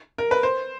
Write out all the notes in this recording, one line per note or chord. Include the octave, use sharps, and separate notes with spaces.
A#4
B4
C5